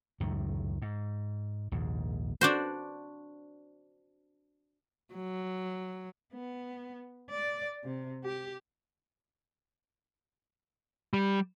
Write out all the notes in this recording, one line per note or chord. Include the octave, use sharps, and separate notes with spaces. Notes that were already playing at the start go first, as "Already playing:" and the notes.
C#2 F#2 A2 D#3
G#2
A#1 D#2 G#2
D4 F#4 C5
F#3
B3
D5
C3
G4
G3